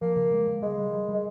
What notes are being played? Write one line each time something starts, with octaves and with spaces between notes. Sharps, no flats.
F3 A#3
C#3
G#3
C#3
G3 G#3
G3
G3
G3
G#3